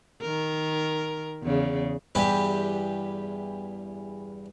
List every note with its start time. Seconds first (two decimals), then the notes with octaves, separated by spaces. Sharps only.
0.21 D#3 A#4
1.42 E2 C#3
2.15 E2 G2 E3 G4 B4